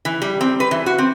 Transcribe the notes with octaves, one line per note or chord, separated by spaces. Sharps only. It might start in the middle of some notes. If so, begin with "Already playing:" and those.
E3
G3
C4
B4
E3
F#4
C4